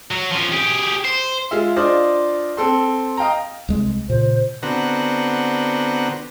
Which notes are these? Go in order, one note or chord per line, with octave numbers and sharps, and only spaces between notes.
F#3
F3 C#4
G4 G#4
C5
G#3 F4 E5
D4 F4 C5 D5 D#5
C4 A4 C6
D#5 F5 G5 A#5
C2 G#3
A#2 C#3 C5
D3 B3 C4 F#4 A#5